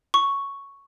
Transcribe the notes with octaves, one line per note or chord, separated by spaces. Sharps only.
C#6